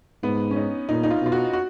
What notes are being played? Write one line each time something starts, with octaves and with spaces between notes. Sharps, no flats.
G#2 B3
C#4
D#4
A#2 D#4
D#4
F4
B2 F4
F#4
F#4